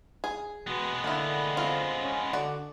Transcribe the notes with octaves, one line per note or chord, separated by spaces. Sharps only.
G#4
B2 G#3 B3
D3 A#3 E4
C4 F4
C#4
D3 F#4 D5